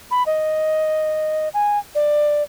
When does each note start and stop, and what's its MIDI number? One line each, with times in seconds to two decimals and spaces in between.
0.11 0.23 83
0.26 1.49 75
1.54 1.79 80
1.95 2.43 74